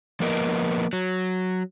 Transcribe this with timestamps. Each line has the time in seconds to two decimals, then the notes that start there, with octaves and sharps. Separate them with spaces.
0.20 F3 A#3 B3 A#4 D#5
0.93 F#3